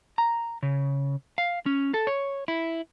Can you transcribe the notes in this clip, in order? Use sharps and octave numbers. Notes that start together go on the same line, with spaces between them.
A#5
C#3
F5
C#4
A4
C#5
E4